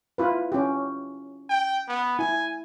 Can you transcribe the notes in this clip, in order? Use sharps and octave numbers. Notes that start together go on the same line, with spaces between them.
E4 F4 B4
C#4 G4
G5
B3
E4 G#5